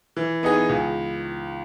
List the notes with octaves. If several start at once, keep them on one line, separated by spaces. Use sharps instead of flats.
E3
B3 D#4 G#4
C#2